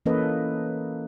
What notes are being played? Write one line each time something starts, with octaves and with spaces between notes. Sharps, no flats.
E3 A#3 C#4 A4 B4 D#5